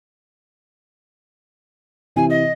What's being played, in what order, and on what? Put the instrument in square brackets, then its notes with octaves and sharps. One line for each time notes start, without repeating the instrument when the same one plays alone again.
[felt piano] C3 E3 C4 [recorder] G#5
[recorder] D#5